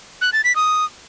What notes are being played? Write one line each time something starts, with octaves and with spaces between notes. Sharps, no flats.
F#6
A6
B6
D#6